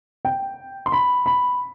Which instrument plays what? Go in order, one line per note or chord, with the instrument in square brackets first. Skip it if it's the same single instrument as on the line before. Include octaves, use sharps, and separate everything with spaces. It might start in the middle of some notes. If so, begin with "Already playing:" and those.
[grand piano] G5
C6
B5
B5